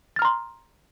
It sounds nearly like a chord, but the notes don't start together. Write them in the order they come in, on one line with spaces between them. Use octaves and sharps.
A6 F6 A#5 C6